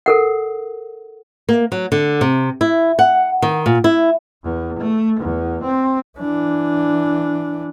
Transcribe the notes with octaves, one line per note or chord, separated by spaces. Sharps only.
A4 A#4 F#5
A#3
F#3
D3
C3
E4
F#5
D#3
A#2
E4
E2
A3
E2
C4
E3 D4